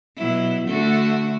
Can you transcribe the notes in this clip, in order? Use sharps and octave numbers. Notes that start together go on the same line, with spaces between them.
B2 F#3 E4
D3 A3 F#4